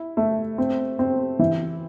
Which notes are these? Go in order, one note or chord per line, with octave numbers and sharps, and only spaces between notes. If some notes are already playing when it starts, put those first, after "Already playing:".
Already playing: E4
A3
C4
C4
E3